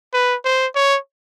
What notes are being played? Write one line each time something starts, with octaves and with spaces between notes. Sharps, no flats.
B4
C5
C#5